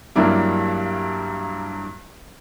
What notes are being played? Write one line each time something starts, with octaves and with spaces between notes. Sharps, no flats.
G2 F#3 G3 A#3 D4 E4